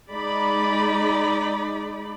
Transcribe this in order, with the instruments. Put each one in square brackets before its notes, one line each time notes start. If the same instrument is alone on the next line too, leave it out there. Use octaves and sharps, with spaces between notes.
[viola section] G#3 D#4 D5 B5